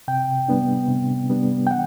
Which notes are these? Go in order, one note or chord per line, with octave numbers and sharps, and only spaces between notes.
C3 G5
G3 B3 D4
C3
G3 B3 D4
G5
E3 F#5